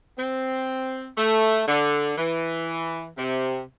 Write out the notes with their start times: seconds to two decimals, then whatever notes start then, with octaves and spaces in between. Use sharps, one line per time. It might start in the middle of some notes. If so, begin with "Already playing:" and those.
0.18 C4
1.17 A3
1.68 D3
2.17 E3
3.17 C3